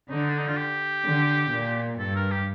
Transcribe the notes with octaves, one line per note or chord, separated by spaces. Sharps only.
D3 D#4
D4
D#4
F4
G4
D3
A#2
G2 A4
A#4
G4